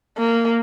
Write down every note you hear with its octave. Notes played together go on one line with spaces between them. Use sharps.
A#3